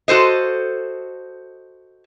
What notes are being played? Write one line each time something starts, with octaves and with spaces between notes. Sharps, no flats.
F#4 A4 C5 D#5